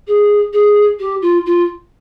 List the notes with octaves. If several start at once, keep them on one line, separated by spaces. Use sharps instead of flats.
G#4
G#4
G4
F4
F4